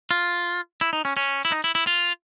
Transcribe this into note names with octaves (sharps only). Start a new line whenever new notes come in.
F4
E4
D#4
C#4
C#4
E4
D#4
E4
E4
F4